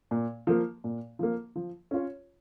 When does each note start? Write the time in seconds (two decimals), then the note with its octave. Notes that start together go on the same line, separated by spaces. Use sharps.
0.11 A#2
0.47 F3 A#3
0.84 A#2
1.19 F3 A#3
1.56 F3
1.91 C#4 F4 C#5